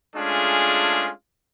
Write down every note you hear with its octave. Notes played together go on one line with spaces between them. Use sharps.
G#3 A3 C#4 D4 F4 G#4